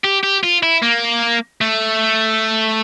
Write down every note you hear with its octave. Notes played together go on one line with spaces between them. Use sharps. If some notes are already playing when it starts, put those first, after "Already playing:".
G4
G4
F4
E4
A#3
A3